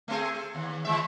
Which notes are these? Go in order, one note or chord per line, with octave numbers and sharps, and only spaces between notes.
A3 C4 G#4
A4
D#2
E3 G#3 E5